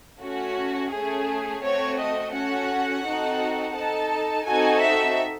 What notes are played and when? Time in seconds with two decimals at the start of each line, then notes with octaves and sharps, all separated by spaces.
0.22 A3 C#4 F#4
0.93 A3 C#4 G#4
1.63 A3 C4 F#4 A4 C#5
1.98 D#5
2.34 C#4 F#4 A4 F#5
3.04 C4 D#4 F#4 A4
3.75 D#4 A4 A5
4.46 C4 D#4 F#4 A4 G#5
4.81 E5